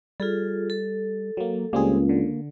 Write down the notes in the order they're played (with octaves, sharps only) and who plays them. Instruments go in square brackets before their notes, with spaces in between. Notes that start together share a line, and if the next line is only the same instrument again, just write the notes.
[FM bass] G3 [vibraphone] F4 G#4 A4
[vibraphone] A4
[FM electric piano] F#3 A#3
[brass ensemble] C#2 [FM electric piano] G3 C4 G#4 [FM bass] A#3
[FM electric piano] D3